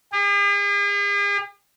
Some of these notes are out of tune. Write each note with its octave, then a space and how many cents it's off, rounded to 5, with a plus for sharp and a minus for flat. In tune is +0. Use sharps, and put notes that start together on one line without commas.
G#4 -45